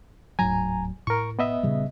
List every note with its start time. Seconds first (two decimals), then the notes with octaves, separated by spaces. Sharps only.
0.39 D1 G#2 F#3 G#5 A#5
1.07 A2 A#4 C#6
1.39 B3 D#5 E5
1.63 A#2 C#3 G3